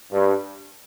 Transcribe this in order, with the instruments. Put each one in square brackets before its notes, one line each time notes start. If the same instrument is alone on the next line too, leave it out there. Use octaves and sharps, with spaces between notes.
[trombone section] G2